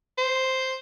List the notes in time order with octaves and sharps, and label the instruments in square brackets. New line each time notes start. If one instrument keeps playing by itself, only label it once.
[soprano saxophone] C5